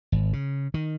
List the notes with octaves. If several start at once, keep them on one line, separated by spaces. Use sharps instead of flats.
G#1
C#3
D#3